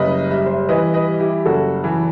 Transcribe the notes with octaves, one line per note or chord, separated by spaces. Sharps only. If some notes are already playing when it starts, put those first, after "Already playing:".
Already playing: F#1 G3 B4 D#5
G3 E5
C5 E5
E3 B4 D#5
B4 D#5
G3
E4 G4
F#1 F#4 A4
E3